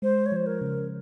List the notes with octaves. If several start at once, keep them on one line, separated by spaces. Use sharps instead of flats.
G#3 C5
C#5
F3 C5
A#4
C#3